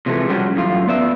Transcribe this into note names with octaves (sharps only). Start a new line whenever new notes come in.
C3 E3 F3 G#3 A3
F3 G3 C#4 D4 F#4 G4
F#2 A2 F4
B3 D5 E5